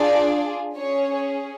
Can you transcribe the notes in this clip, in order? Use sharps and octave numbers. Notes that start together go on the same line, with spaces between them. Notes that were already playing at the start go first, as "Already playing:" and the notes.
Already playing: D4 F4 G#4 D5
C#4 G#4 C#5